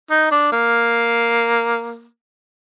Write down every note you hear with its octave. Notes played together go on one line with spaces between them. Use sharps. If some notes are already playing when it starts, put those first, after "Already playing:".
D#4
D4
A#3